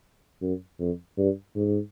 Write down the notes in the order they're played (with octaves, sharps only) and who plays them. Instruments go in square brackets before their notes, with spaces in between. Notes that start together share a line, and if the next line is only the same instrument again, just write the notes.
[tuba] F#2
F2
G2
G#2